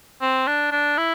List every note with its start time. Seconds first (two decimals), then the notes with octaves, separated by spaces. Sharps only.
0.22 C4
0.47 D4
0.72 D4
0.98 E4